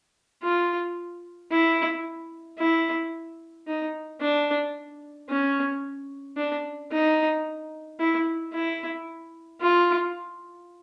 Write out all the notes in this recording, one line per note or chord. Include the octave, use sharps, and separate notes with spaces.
F4
E4
E4
D#4
D4
C#4
D4
D#4
E4
E4
F4